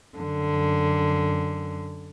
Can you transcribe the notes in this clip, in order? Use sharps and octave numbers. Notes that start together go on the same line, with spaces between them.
F#2 D3